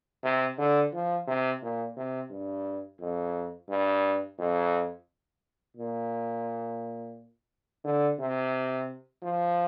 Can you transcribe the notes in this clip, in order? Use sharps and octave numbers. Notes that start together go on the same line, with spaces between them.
C3
D3
F3
C3
A#2
C3
G2
F2
G2
F2
A#2
D3
C3
F3